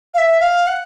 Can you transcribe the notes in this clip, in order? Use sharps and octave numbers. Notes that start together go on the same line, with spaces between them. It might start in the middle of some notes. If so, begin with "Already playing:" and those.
F5
E5
F5
F#5